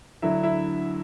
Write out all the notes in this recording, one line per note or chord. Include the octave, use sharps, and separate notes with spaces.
D2 D3 F#3 E4 E5
E4 E5